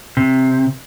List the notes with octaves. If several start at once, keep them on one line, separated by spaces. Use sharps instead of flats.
C3